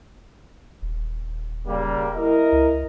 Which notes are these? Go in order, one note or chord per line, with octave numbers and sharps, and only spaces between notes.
D#1
C#3 G3 A#3
E4 A#4 D#5
C#2